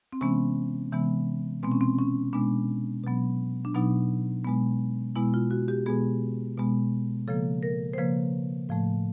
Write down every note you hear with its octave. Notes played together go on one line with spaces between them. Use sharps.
C4
C3 E3 G#3 B3 C#4
C3 E3 G#3 B3
B2 G#3 B3 C4
C#4
C4
C#4
B2 G#3 B3 D4
B2 F#3 B3
D4
B2 F#3 B3 D#4
B2 G#3 B3
B2 G#3 B3 E4
F4
F#4
G4
B2 G#3 B3 G#4
B2 G#3 B3
C#3 F3 A#3 A4
A#4
C5
C#3 F3 A#3 B4
A2 F3 A3